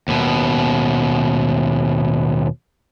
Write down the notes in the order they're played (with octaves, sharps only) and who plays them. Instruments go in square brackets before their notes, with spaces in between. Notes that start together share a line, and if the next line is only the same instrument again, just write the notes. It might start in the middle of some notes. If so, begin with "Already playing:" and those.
[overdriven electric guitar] D#2 B2